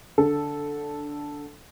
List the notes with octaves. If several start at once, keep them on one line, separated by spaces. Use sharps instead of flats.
D3 A4